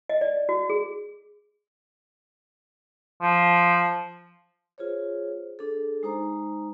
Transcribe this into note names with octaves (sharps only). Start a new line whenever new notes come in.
D#5
D5
F#4
G#4
F3
F4 G#4 C5 C#5
D4 G#4 A4
G#3 D#4 C5 A#5